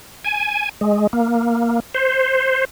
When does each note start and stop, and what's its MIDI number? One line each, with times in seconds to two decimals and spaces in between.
0.25 0.69 80
0.81 1.07 56
1.13 1.80 58
1.94 2.65 72